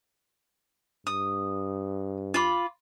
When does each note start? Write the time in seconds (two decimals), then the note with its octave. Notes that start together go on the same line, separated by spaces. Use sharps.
1.07 G2 D#6
2.34 F4 B5 D6